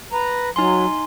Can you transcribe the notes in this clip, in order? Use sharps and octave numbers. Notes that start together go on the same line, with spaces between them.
B4 A#5
F#3 D#4 G#5 C6